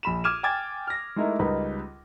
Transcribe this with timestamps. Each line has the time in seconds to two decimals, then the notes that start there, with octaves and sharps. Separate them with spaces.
0.03 A#1 B5 E7
0.24 D6 F6 G#6 D#7 E7
0.43 G5 G#5 D6 G#6 A6
0.87 F6 A#6
1.16 G#3 A3 D#4 E4 A#4
1.39 C#2 G3 D#4 A#4 B4 B5